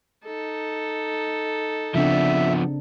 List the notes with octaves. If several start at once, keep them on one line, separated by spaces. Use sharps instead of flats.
D#4 A4
C#3 F3 B3 C4 D4 E5